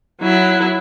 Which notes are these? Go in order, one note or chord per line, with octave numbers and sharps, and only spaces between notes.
F#3 E4